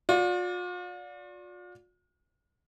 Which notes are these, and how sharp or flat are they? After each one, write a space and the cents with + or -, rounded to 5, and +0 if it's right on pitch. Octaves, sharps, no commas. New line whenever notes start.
F4 +45 D5 -15